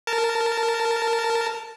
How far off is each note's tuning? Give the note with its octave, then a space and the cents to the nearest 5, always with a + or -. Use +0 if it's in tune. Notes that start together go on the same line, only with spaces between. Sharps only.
A#4 -15 A5 +0